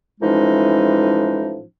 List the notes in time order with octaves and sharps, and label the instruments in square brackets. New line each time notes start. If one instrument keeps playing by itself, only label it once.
[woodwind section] A2 E3 F3 G#3 C#4 D#4